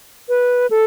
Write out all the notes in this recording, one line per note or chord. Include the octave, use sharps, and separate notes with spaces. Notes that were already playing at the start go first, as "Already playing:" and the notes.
B4
A4